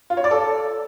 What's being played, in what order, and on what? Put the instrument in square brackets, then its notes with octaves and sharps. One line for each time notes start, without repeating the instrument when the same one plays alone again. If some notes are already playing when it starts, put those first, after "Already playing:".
[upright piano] F4
C#5
D5
A4